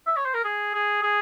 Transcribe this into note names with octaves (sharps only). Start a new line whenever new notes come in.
E5
C#5
C5
A#4
G#4
G#4
G#4